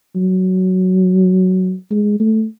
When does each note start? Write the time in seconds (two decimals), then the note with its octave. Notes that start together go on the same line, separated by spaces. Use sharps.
0.16 F#3
1.90 G#3
2.20 A3